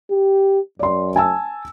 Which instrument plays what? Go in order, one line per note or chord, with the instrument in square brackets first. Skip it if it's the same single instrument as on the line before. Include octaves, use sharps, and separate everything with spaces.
[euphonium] G4
[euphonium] F#2 [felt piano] D5 C6
[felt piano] G#5 A5 E6